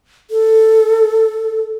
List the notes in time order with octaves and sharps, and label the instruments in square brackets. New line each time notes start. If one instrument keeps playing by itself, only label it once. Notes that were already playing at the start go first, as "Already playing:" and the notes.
[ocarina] A4